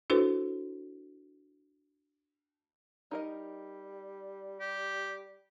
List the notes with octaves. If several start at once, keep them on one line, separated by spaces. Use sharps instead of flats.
D4 E4 F#4 A4 B4 C5
G3 D#4 A#4 D#5
G4